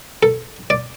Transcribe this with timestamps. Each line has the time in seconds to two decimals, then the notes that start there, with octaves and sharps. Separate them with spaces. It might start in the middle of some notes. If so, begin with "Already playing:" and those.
0.23 A4
0.70 D5